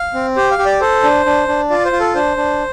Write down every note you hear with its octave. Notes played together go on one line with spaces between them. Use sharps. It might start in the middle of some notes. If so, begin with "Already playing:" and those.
Already playing: F5
C4
G4 C5
F5
G4
D5
A4 C5
D4
D4
D4
F4 D5
C5
F4
A4
D4 C5
D4